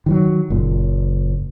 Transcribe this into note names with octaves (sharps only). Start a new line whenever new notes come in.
D#3 F3 F#3
F#1 A#2